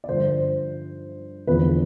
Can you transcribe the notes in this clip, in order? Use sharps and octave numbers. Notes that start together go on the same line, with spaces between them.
D5
G2 D3 F3 C5
E2 D3 F3 B4